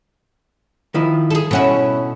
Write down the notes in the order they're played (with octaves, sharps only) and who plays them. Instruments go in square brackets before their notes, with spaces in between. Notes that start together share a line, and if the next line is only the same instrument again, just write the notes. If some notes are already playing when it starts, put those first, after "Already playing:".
[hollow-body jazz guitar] D#3 F3 E4
[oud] G#4 A4
[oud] B2 C#4 E4 [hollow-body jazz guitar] A4 F#5